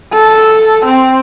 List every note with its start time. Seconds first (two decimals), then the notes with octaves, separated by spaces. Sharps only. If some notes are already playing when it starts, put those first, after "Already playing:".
0.13 A4
0.85 C4